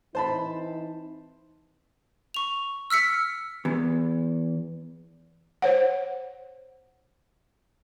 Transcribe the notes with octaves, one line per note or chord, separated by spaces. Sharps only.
E3 C4 D#4 C5 A5 B5
C#6 F7
E6 F6 B6 C#7
E2
C5 C#5 F#5